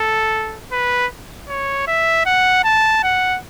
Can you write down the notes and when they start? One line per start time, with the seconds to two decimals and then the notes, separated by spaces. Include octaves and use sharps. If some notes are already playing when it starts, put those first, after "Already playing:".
Already playing: A4
0.72 B4
1.49 C#5
1.88 E5
2.26 F#5
2.64 A5
3.03 F#5